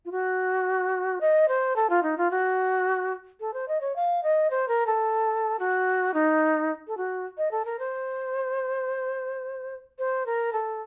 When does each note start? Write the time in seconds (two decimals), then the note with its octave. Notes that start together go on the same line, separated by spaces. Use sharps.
0.05 F4
0.12 F#4
1.21 D#5
1.48 C5
1.76 A4
1.90 F4
2.03 D#4
2.18 F4
2.31 F#4
3.40 A4
3.54 C5
3.68 D#5
3.81 C#5
3.96 F5
4.23 D#5
4.51 C5
4.68 A#4
4.87 A4
5.59 F#4
6.14 D#4
6.88 A4
6.97 F#4
7.38 D#5
7.51 A4
7.65 A#4
7.79 C5
9.99 C5
10.26 A#4
10.53 A4